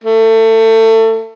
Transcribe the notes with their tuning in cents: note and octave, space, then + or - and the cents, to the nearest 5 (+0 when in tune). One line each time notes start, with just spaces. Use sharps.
A3 +25